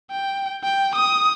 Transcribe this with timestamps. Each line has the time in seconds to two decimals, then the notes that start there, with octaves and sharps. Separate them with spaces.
0.11 G5
0.63 G5
0.95 D#6